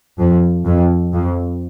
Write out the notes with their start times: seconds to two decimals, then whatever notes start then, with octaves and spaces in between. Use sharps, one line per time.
0.18 F2
0.65 F2
1.13 F2